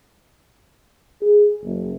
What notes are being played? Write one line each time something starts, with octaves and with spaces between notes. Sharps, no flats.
G#4
F#1